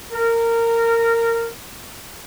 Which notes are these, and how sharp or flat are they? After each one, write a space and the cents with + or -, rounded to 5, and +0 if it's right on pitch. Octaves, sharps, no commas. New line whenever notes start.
A#4 -15